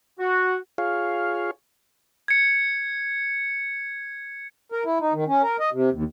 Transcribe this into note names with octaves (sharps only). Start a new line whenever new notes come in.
F#4
F4 G#4 C#5 F5
G#6 C#7
A#4
E4
D#4
D#3
C#4
A#4
D#5
C3
D#2